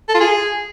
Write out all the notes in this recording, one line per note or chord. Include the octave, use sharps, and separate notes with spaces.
A4
F4
G#4